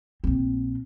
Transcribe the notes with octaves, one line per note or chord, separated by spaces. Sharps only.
A#1 C4